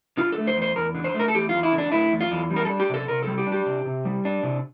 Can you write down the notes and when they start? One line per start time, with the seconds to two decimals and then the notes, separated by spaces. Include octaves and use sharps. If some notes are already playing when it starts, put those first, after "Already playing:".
0.17 D3 F4
0.32 A4
0.38 A3
0.47 C5
0.56 E2
0.62 C5
0.76 E2 A#4
0.95 D3
1.04 C5
1.14 A3
1.19 A#4
1.28 A4
1.34 E2 G4
1.49 E2 F4
1.63 E4
1.73 D3
1.78 D4
1.91 A3 E4
2.12 E2
2.21 F4
2.31 E2
2.50 G3
2.56 A#4
2.65 A4
2.70 D4
2.80 G4
2.89 C3 A4
3.08 C3 A#4
3.23 G3 A4
3.38 G4
3.47 D4
3.52 G4
3.66 C3
3.86 C3
4.05 G3
4.25 D4
4.43 C3